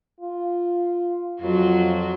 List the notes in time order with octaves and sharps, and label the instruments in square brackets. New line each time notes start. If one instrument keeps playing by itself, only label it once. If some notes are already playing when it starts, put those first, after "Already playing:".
[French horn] F4
[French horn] F2 [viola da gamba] F#3 F4 F#4